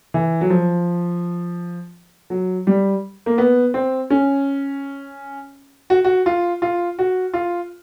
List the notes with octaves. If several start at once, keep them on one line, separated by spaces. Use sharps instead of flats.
E3
F#3
F3
F#3
G3
A#3
B3
C4
C#4
F#4
F#4
F4
F4
F#4
F4